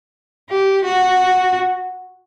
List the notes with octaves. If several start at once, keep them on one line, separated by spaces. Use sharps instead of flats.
G4
F#4